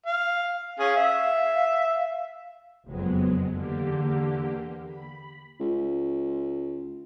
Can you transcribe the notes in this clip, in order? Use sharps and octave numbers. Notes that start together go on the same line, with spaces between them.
F5
C#4 G#4 F5
E5
F#1 F2 F#3 G#3 B3
E2 D3 A#3 G4
B5
C#2